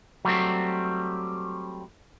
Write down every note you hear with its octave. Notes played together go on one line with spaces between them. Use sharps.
F#3 G3 A3 C4